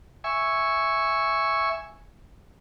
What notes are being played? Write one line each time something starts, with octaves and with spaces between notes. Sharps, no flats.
E5 G#5 C#6